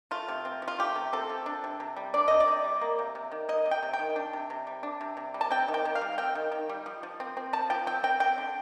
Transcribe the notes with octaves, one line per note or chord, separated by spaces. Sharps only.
A3 F4
C3
C4
F3
F4
A3 G4
C3
C4 A4
F3
D4
C3
C3
G3
D4 D5
C3 D#5
D5
C3
G3
A#3
C3
C3
D#3
A#3 D#5
C3
G5
C3
G5
D#3
D4
C3
C3
G3
D4
C3
C3
G3
A5
C4 G5
D#3
G5
D#3
F5
G3
C4 G5
D#3
D#3
G3
F3
F3
C4
C4
F3 A5
F3 G5
C4 G5
C4 G5
C4 G5
D3